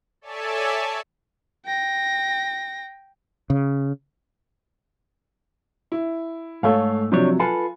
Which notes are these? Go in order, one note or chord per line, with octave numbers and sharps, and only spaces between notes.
A4 C#5 D5 E5 G#5 A5
G5 A#6
C#3
E4
G#2 A3 A4 C#5 F5
C3 F3 F#3 C4 D4 C#5
F4 A4 B4 G#5